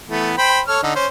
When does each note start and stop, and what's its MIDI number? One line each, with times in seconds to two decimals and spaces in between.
0.08 0.33 52
0.08 0.33 57
0.08 0.33 59
0.38 0.61 72
0.38 0.61 79
0.38 0.61 83
0.68 0.80 69
0.68 0.80 73
0.68 0.80 89
0.83 0.93 50
0.83 0.93 63
0.95 1.07 61
0.95 1.07 72